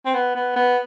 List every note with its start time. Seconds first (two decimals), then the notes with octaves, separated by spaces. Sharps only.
0.06 C4
0.14 B3
0.35 B3
0.56 B3